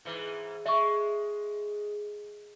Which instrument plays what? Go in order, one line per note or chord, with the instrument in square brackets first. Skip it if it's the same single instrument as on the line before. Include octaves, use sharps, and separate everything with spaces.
[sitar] G#2 E3
[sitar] G#3 [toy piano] E5 C#6